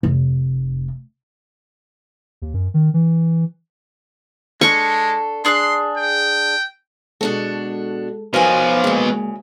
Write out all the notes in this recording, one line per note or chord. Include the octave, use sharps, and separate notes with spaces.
F1
D#2
F#2
D#3
E3
G#3 D4 A4 C#6
D4 G#4 C6 F#6
G5
B2 G#3 D4 F#4 A4
B2 F3 F#3 A#4 B4 G#5
D2 C#3 G#3 A#3